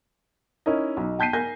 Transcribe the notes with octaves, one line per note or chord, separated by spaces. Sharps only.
C#4 D#4 E4 A#4 D#5
B1 D#4
G5 A5 G6 B6 C7 D#7
A#4 G#5 G6 A#6